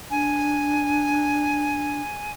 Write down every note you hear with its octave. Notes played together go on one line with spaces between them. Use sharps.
D4 G#5